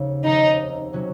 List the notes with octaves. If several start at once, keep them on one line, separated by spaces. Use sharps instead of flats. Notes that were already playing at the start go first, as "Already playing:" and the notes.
Already playing: F1 D#2 C#3
F1 D#2 C#3 D#4
C3 F#3 C#4 F#4